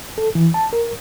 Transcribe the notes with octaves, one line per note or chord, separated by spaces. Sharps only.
A4
E3
A5
A#4